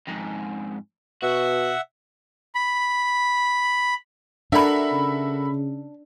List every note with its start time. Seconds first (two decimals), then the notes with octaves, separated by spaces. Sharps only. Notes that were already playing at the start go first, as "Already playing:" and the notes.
0.08 F2 G#2
1.23 B2 F#4 E5 F#5
2.55 B5
4.52 D4 F#4 A4 A#4 E5 B5
4.92 C#3